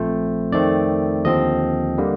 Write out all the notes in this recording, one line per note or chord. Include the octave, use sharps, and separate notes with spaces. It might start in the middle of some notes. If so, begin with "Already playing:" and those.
Already playing: A#1 A#2 F3 A3 C4 C5
F2 D#3 A3 C4 D5
D#2 D3 F3 C4 D#5
D3 G3 A#3